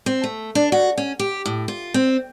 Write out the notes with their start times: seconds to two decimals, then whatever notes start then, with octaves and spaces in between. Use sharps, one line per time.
0.06 C4
0.24 A3
0.55 D4
0.72 F#4
0.98 C#4
1.19 G4
1.46 A2
1.68 F4
1.94 C4